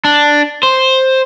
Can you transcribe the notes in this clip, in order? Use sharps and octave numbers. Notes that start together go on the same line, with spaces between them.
D4
C5